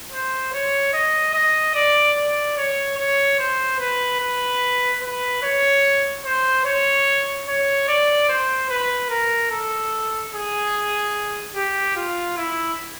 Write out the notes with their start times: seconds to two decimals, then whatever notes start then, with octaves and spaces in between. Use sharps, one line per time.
0.12 C5
0.53 C#5
0.93 D#5
1.34 D#5
1.75 D5
2.16 D5
2.57 C#5
2.98 C#5
3.39 C5
3.79 B4
4.20 B4
5.02 B4
5.43 C#5
6.25 C5
6.65 C#5
7.47 C#5
7.88 D5
8.29 C5
8.69 B4
9.10 A#4
9.51 A4
10.32 G#4
11.55 G4
11.96 F4
12.37 E4